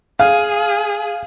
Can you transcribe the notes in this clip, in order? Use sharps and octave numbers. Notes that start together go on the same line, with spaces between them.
G#4 F5